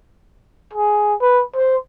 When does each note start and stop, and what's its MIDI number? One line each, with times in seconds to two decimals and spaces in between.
0.73 1.14 68
1.21 1.42 71
1.55 1.76 72